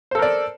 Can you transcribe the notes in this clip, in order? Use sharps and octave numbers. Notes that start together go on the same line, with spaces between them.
A4 A#4 C5 D5